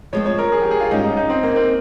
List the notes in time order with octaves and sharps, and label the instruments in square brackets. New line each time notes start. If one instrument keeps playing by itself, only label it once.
[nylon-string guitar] F3 G#3 C4 [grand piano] C#5
[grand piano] C#5
A#4
G#4
G4
G#4
F4
[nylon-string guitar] G#2 G3 C#4 G4 [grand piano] D#4
[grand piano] D#4
D#4
C4
A#3
C4